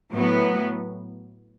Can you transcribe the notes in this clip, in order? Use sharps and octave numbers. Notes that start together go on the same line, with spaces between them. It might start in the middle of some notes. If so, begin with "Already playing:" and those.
A2 F#3 B3